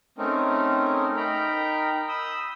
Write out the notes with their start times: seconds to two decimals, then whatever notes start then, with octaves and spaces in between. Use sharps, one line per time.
0.18 A3 C4 C#4 D#4 A#4
1.16 D#4 A#4 G5 A#5 B5
2.09 B5 D#6 E6 G6